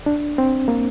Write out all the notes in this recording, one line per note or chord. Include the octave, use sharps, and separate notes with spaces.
D4
C4
A#3